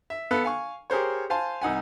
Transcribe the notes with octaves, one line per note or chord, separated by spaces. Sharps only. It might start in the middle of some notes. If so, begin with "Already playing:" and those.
E5
B3 A4 B4 F5
F5 G#5 C#6
G4 G#4 A#4 C5 C#5
C5 F5 G#5 A5 C6
C2 D#4 F#5 G#5